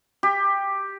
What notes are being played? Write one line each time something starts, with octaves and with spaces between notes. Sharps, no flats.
G4